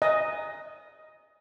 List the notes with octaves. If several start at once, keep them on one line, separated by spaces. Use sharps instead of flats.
D#5